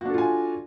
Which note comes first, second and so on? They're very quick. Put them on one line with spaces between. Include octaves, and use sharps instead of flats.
F#4 D4 A4 F4 G#5